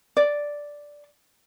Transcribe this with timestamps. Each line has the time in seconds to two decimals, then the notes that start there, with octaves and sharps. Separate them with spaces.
0.17 D5